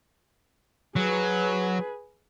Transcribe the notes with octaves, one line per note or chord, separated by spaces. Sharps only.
F#3 G#4 B4